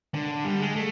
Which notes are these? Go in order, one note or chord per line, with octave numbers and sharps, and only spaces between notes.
D3
G3
G#3
A3